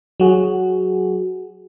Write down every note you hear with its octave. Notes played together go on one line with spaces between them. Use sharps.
F#3 F#4 G#4